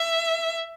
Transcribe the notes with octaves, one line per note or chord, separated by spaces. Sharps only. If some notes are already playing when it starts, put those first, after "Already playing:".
Already playing: E5